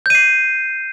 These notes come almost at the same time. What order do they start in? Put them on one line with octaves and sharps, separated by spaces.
G6 D#7 C7